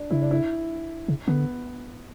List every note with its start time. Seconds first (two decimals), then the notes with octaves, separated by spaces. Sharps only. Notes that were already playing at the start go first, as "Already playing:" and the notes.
Already playing: D4
0.11 C#3 E4
0.22 D4
0.31 E4
1.08 C#3
1.28 D3 B3